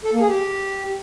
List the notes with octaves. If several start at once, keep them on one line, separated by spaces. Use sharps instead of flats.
A4
A#3
G#4
G4